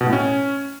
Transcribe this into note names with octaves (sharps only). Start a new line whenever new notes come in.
B2
A2
C#4